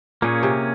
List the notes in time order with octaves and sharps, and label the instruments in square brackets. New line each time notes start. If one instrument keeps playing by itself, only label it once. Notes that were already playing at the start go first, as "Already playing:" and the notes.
[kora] A#2 [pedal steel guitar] A#3 C#4 G#4 C#5
[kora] C3